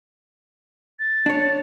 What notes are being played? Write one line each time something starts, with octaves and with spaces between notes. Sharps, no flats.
A6
D4 C#5